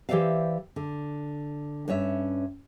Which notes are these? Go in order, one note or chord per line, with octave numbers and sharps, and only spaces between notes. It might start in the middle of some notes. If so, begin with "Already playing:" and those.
E3 G4 C5 D5 E5 F5
D3
G2 C#4 C#5 E5